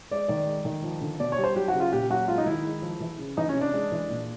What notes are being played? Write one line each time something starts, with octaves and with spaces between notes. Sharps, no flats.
G#3 D5
D#3 D5
G#3
D#3
F3
D3
B2 D5
C#5
G3
C5
F#3 G4
F#4
C#3
F4
A#2 G4
F#3 F#4
G#3 F4
D#4
D#3 E4
G#3
F3
E3
C#3
E3 D#4
C#4
C3
D4
G#3
E3
A#2